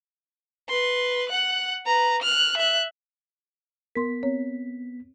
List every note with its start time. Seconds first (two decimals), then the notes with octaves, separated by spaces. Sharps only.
0.69 B4 C6
1.29 F#5 F#6
1.86 B4 A#5
2.22 F6 F#6
2.57 E5 F#6
3.95 B3 A#4 C6 B6
4.23 C4 C#5